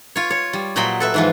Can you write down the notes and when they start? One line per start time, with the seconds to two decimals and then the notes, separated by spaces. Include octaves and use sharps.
0.16 F4 C#5
0.30 C#5
0.53 G3
0.76 A#2 F#3 D#5 G5 B5 C6
1.00 A4 B4 E5
1.14 G#2 E3 F3